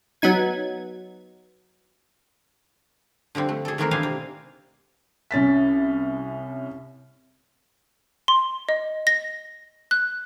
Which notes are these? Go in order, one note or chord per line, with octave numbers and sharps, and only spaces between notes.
F#3 B3 D#4 G#6
D3 F3 G3 C4
A3
G#4 A4
D#3 E3 A3 B3 C4 A#4
B2 D4 E4 C5 F5 G#5
C3
C2 C#4 A6 B6
C6
D#5
A#6
F#6